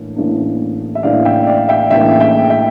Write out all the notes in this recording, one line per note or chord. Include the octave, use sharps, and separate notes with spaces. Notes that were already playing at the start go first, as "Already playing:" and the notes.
Already playing: A2 E3 A#3 D4
A1 A2 E3 A#3 D4
E5
A1 A2 E3 A#3 D4 D5 F5
E5 G5
D5 F5
E5 G5
A1 A2 E3 A#3 D4 E5 G5
E5 G5
E5 G5